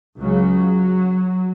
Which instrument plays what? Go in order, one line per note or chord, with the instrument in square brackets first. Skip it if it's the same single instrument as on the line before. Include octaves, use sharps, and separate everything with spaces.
[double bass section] C#2 C#3 F#3